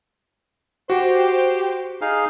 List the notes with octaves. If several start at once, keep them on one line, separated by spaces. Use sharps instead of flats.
F#4 G4 C5
D#4 G#4 F5